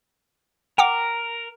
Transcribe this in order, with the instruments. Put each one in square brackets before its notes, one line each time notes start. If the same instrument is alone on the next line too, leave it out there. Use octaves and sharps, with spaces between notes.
[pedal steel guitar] A#4 [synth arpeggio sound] F#5 G5 D6